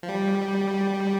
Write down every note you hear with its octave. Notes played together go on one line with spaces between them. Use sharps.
F3
G3